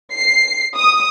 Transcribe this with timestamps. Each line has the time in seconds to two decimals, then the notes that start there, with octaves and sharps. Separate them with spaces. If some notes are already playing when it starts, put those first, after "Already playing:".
0.13 C7
0.75 D#6